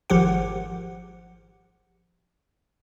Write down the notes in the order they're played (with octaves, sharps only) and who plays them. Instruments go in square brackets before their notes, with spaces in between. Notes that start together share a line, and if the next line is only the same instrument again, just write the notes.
[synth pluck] G#1 F3 G4 F#5